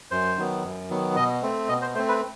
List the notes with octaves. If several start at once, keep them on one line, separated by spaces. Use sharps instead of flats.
F#2 C5
D#3 F#3 B3
F#2
D#3 F#3 B3
B2 D#5
A3 C4
B2 D#5
C5
A3 C4 C5
B4